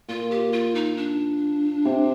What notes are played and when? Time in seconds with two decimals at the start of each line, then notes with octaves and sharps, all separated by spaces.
0.09 A#2 F4
0.31 G4
0.53 F4
0.75 D#4
0.97 D4
1.85 C3